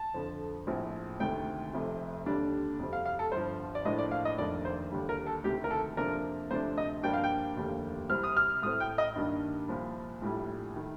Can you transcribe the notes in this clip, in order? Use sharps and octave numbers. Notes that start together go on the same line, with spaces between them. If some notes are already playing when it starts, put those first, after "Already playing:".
Already playing: A5
F2 D3 F3
A#1 A2 F3 C4
D2 C3 D#3 G5
F1 F2 C3
D#2 D3 G3 D4
F2 C3 G3 C4
F5
F5
A4
G1 G2 F3 C5
D5
A2 F3 A#3 D4 D#5
D5
F5
D#5
F1 F2 D#3 A#3 D4 D5
C5
D#2 D3 G3
A#4
A4
D2 C3 D#3 G4
A#4
A4
F2 C3 F3 A#3 D4 A#4
D2 C3 F3 A3 D4 C5
D#5
G2 F3 A#3 D4 G5
F5
G5
F1 D#2 D3 G3 A#3
C2 C3 G3 C4 F6
D#6
F6
A2 A3 C4 D#6
G5
D#5
G2 D#3 A#3 D4
C2 A#2 F3
A#1 A2 G3
D#3 A3